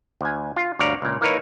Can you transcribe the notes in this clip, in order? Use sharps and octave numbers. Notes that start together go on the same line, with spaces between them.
D2 G#5
F4
D2 G2 C#5 D5 F5 A#5
C#2 A#2
E3 A#3 D#4 A#4 B4 C#5